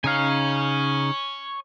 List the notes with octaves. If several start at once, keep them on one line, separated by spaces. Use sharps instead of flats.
C#3 D#4 C#5 F5 G#5